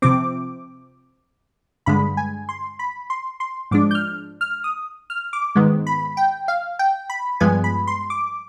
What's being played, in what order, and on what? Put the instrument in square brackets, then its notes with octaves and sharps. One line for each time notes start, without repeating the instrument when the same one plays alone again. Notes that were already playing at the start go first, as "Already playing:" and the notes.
[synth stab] C3 F3 C4 D6
G2 D3 G#3 B5
G#5
C6
B5
C6
C6
G#2 F3 G#3 D4 D6
G6
F6
F6
D#6
F6
D6
G#2 D#3 G#3 B3
B5
G5
F5
G5
B5
G2 F3 G#3 B3 G#5
B5
C6
D6